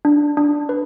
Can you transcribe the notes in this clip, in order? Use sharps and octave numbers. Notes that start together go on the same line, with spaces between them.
D4
D4
B4